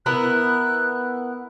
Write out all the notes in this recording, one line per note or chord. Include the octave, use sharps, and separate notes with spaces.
B3 E4 A#4 F#6